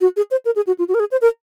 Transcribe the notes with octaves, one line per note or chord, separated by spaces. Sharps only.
F#4
G#4
C5
A#4
G#4
F#4
F4
F#4
A#4
G#4
C5
A#4